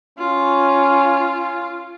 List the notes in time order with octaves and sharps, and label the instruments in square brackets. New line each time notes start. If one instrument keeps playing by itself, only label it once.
[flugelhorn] C#4 [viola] F4